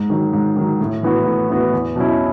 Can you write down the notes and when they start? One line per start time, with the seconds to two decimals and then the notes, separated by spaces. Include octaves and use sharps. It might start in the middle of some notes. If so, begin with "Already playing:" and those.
Already playing: G#2
0.10 D#3 F#3
0.33 G#2
0.57 D#3 F#3
0.80 A2
1.03 E3 B3 F#4
1.26 A2
1.49 E3 B3 F#4
1.73 E2
1.96 B2 F#3 C#4 E4